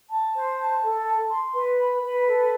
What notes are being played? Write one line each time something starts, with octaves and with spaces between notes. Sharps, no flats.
A5
C5
A5
A4
A5
C6
B4
B5
B4
A4